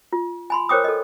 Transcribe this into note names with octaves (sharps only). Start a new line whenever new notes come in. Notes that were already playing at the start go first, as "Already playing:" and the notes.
F4
G#5 B5 C6
A#4 C5 C#5 G5 D6 D#6
A4 D#5